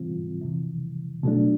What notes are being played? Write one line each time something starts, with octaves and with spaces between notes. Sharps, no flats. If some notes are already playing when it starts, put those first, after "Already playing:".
Already playing: G#2 E3 G3 C4 F4
F2 C3 E3
B2 F#3 A3 D4